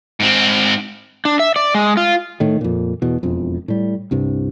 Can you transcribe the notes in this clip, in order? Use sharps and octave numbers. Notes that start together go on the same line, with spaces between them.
G#2 C4
D4
E5
D5
G#3
F4
A2 D#3
F2 A#2
E2 B2
E1 F2
A2 G3
C2 G2 C3